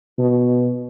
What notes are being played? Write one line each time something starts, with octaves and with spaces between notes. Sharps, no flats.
B2